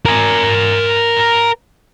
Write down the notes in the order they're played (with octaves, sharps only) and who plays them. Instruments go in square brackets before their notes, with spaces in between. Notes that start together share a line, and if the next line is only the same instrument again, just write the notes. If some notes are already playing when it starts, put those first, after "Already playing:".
[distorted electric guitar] A#4 G#5